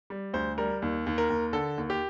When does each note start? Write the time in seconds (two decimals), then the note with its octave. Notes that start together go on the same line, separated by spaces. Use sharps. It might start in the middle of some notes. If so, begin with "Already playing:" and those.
0.10 G3
0.34 D2 C5
0.58 G3 A#4
0.82 D#2
1.06 D#2
1.18 A#4
1.30 D#2
1.53 D3 A4
1.78 D#2
1.90 G4